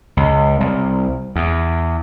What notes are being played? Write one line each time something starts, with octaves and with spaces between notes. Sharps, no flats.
C#2
C2
E2